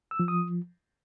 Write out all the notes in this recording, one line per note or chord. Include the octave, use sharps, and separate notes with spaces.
E6
F3
D#6